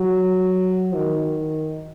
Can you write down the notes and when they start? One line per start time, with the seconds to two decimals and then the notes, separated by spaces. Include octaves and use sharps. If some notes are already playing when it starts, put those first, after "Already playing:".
Already playing: F#3
0.95 D#3